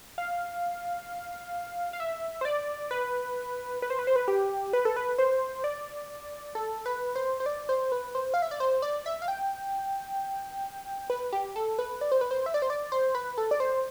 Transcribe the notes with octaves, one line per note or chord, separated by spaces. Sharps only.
F5
F5
E5
C5
D5
B4
B4
C5
B4
C5
B4
G4
B4
A4
B4
C5
D5
A4
B4
C5
C5
D5
C5
B4
C5
F5
E5
D5
C5
D5
E5
F5
G5
B4
G4
A4
B4
D5
C5
B4
C5
E5
D5
C5
D5
C5
B4
A4
D5
C5